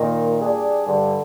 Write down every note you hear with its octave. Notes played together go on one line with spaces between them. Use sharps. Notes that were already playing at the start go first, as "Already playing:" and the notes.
Already playing: A#2 D#3
G3 D4 G#4
G2 D3